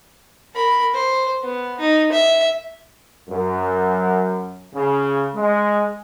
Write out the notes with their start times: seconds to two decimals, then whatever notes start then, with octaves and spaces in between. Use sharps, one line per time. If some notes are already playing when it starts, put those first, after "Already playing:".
0.54 A#4 B5
0.94 C5
1.42 B3
1.79 D#4
2.12 E5
3.29 F#2
4.74 C#3
5.35 G#3